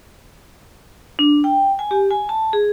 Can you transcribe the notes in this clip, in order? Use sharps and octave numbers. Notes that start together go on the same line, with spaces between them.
D4
G5
G#5
G4
G#5
A5
G#4